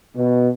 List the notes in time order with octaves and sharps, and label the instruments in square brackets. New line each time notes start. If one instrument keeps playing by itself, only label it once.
[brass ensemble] B2